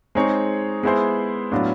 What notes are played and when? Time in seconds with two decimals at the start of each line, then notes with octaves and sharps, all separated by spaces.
0.15 G#3 C4 D#4 G#4 C#5
0.83 G#3 B3 E4 G#4 C5
1.52 A2 F#3 B3 D4 F4